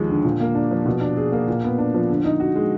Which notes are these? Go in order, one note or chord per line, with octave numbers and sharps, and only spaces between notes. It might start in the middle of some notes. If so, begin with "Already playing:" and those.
Already playing: D#2 F3 G#3
D3
A#2
A#3
D4
F3
B2
D4
G#4
A#3
A#2
B3
D4
F3
D3
D#4
F#4
G#3